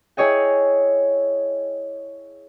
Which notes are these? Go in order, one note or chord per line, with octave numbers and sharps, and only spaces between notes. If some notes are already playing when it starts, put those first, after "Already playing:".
E4 G#4 C#5 D#5 G5